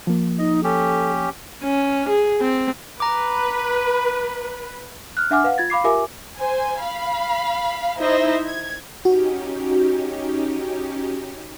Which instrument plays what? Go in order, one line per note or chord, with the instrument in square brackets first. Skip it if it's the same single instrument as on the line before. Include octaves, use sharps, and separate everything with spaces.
[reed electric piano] F3 A#3
[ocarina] D#4 [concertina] D#5
[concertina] C#4 G4 [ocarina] A4
[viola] C#4
G#4
C4
[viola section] B4 [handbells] A#5 D6
[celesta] F6 F#6
D4 E5 F#5 G#5 D6 F6
B4 F5 F#5
F4 G#6 A6
F5 B5 D6 C7
F4 G4 A#4 E5 G#5 D6
[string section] C5 G#5
F5 B5
D#4 E4 C5 D#5 E5
G#6
[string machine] C#4 D#4 G4 [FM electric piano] F#4